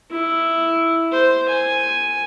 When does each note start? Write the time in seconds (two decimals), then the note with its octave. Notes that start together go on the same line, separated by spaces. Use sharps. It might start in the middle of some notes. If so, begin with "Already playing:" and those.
0.11 E4
1.12 C5
1.48 G#5